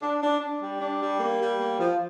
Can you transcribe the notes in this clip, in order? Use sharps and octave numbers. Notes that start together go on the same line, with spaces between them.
D4
D4
D4
G3
D4
G3
A#3
G3
A#3
F3